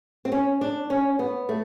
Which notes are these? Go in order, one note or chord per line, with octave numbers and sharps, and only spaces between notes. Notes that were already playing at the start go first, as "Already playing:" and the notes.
C4
C#4
D4
C#4
B3
A3